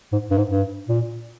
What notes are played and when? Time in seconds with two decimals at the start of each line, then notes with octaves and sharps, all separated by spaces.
0.12 G#2
0.31 G2
0.37 G#2
0.51 G2
0.88 A#2